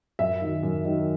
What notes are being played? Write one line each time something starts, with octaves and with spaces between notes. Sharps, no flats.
F#2 E5
D#3 F#3
F#2
D#3 F#3